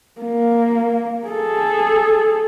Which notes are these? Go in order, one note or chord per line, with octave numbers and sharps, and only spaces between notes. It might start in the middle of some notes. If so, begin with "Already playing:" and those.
A#3
G#4 A4